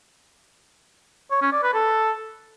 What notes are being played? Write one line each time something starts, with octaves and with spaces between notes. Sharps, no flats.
C#5
C#4
D5
B4
A4